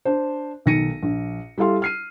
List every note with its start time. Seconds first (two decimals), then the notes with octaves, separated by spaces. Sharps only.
0.05 D4 C5
0.66 B1 D#3 A#6 C#7 D#7
1.03 A#1
1.58 G3 E4 A4 F5 C6
1.82 F6 C7 D#7